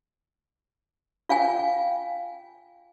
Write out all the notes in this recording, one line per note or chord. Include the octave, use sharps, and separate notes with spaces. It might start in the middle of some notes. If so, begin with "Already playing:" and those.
F4 F5 G5 G#5